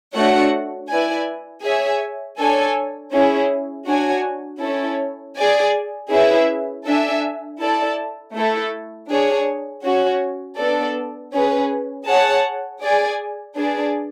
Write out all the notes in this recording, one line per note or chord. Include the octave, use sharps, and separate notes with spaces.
A3 D4 F#4 C#5 F#5
E4 B4 D5 G#5
G#4 C#5 E5 G#5
D4 A4 C#5 G#5
C#4 E4 G#4
D4 F#4 C#5 G#5
C#4 E4 A4 C#5
G#4 D5 G#5
C#4 E4 G#4 B4 E5
D4 A4 E5 G#5
E4 A4 D5 A5
A3 E4 A4
D4 G#4 C#5
C#4 F#4 C#5
B3 D4 A4 D5
C#4 G#4 B4
G#4 C#5 F#5 A5
G#4 D5 G#5
D4 G#4 B4 D5